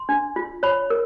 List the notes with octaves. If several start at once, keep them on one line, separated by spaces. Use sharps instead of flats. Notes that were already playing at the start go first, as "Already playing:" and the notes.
Already playing: C6
D4
F4
C#5 B5
A#4